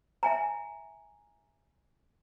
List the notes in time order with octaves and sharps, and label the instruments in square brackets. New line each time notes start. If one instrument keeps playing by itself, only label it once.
[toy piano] E5 G#5 A#5